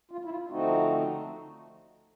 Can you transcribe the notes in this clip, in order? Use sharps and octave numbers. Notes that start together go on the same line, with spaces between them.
F4
E4
F4
D3 F3 A3 C4 D#4 F#4